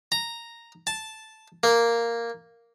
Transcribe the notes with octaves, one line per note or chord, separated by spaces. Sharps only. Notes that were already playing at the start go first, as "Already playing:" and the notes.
A#5
A5
A#3